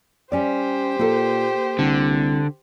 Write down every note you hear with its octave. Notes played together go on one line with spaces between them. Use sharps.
G3 C#4 G4 C5 D5
A#2 A#3 A4
C2 D3